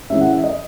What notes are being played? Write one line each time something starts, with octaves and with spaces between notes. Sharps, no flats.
E3 G#3 C#4 E5
F#5
E5
D#5